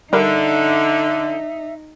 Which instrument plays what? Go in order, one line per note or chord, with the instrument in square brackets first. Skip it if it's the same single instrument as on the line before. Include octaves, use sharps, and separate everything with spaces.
[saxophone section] D3 [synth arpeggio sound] G3 A#4 [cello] D#4 [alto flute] E5